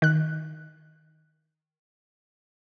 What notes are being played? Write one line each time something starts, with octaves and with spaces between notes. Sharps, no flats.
D#3 F#6